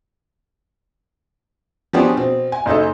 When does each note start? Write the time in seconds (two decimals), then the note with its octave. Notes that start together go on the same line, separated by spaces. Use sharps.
1.93 F3 B3 C#4 D4 G4 G#4
2.16 B2 C4
2.52 G#5
2.66 F#1 D#4 G#4 A4